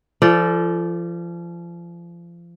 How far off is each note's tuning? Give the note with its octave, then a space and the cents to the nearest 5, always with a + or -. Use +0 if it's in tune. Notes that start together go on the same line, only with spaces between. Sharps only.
F3 -30 A4 +0 D5 -10